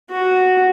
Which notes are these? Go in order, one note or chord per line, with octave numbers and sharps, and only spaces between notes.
F#4